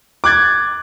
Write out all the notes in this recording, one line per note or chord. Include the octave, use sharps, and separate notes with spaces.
D6 F#6 G#6 A6